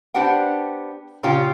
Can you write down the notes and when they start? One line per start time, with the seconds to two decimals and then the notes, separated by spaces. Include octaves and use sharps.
0.14 B3 D4 G4 C5 F#5 G5
1.23 A#2 C#3 C#4 F4 G4